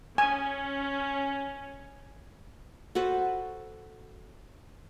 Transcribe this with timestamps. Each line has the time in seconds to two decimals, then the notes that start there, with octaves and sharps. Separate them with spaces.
0.18 C#4 G#5
2.95 F#4 A4 B4 C5